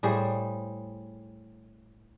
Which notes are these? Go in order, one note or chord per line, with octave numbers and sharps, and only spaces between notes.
A2 G3 G#4 C5